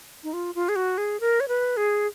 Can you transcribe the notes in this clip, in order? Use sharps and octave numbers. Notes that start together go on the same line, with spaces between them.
D#4
F4
F4
G#4
F#4
G#4
A#4
C#5
B4
G#4